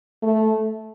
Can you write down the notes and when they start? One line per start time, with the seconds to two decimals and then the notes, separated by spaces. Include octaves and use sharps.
0.23 A3